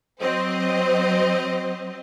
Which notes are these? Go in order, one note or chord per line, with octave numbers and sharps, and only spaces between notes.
F#3 C4 C5 D#5